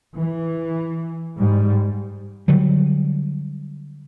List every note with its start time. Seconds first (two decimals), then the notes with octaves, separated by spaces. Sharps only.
0.17 E3
1.38 G#2 G3
2.48 D3 F#3 G3